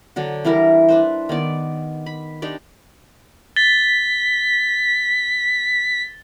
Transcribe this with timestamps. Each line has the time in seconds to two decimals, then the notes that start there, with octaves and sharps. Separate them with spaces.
0.16 D3 F#3 D4
0.45 E3 G3 E4 A#4
0.88 D4 B4 C5
1.29 D#3 B3 D5
2.06 B5
2.42 D4 D#4 G4 D5
3.56 A6 B6 G7